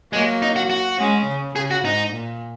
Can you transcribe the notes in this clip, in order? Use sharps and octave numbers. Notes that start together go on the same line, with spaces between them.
F#3 G#3 A#3
D#4
F#4
F#4
G#3 C#4
C#3
C#3 G#4
F#4
G#2 D#4
A#2